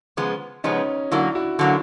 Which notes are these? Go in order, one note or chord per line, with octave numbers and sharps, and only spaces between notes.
C#3 F3 G#3 B3
C#3 F3 G#3 B3 C#4 D#4
D3 F#3 A#3 D4 E4
E4 F#4
D3 F#3 A#3